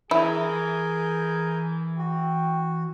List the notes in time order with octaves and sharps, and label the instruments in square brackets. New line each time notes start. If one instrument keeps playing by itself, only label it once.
[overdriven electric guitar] E3 [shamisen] E4 [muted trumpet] G#4 [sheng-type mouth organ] A#4 G#5 G6
[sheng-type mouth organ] F#4 [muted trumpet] G5